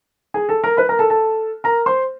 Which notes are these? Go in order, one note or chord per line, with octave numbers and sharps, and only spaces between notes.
G#4 G#5
A4 A5
A#4 A#5
B4 B5
A#4 A#5
A4 A5
A4 A5
A#4 A#5
C5 C6